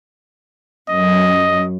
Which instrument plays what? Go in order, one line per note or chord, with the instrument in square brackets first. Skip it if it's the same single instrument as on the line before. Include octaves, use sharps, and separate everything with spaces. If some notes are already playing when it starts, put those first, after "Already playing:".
[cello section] F#2 [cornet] D#5